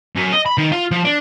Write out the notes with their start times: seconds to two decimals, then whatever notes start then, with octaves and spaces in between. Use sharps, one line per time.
0.16 F#2
0.32 D#5
0.46 B5
0.58 D#3
0.72 F4
0.91 F3
1.05 D4